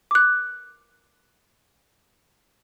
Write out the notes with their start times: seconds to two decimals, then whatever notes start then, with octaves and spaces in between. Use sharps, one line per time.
0.11 D6 F#6